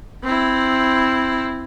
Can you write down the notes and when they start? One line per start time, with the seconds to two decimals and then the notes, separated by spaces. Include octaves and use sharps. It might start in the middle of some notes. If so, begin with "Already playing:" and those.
0.23 C4 E4